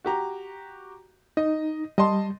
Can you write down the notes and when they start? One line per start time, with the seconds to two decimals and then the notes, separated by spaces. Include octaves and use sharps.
0.05 F#4 G4 A#5
1.37 D#4 D#5
1.98 G3 D#5 A5 C6